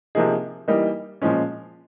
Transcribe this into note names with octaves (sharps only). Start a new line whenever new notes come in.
C3 F3 A#3 D#4 G#4
E3 G3 A#3 D#4
A#2 F3 G#3 C#4